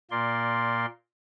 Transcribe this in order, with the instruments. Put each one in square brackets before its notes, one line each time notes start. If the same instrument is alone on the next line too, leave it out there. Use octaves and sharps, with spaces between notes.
[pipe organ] A#2 A#3 D5 C6